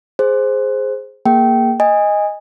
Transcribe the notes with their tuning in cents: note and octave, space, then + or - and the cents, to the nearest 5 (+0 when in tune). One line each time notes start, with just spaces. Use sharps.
G#4 +0 C5 +0
A#3 +0 G#4 +0 G5 -20
D#5 +0 G#5 -20